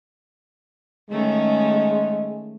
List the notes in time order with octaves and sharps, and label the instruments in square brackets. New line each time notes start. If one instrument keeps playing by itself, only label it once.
[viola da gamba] D#3 A3 C#4 [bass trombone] G#3